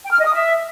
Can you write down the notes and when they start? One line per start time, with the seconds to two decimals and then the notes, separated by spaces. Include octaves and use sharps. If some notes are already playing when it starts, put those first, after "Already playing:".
0.05 G5
0.12 F6
0.19 D#5
0.26 D#6
0.33 E5